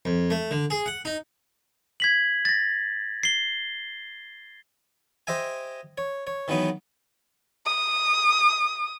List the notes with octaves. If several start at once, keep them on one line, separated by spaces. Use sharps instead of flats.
F2
A3
D3
G#4
F#5
D#4
G#6 B6 F#7
A6 A#6
C7 G7
G4 C5 D#5 E5 G#5
C#5
C#5
D#3 E3 F#3 B3 D#4
D#6